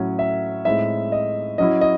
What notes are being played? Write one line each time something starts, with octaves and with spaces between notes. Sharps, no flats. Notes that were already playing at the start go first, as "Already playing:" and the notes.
Already playing: A2 F#3 C#4
E5
A2 G#3 C4 D#4 E5
D#5
F#3 C#4 E4 D#5
D#5